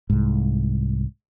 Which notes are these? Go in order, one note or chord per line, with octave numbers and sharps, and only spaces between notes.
C2 G#2